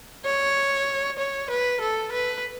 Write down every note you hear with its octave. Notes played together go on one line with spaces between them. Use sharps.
C#5
C#5
B4
A4
B4